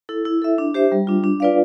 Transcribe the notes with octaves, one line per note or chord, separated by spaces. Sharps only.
E4 A4
E4
A4 E5
D4
G4 C5 E5
G3
D4 F4
D4
F4 B4 D5 F5